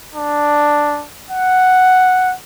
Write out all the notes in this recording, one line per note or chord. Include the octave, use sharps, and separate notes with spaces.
D4
F#5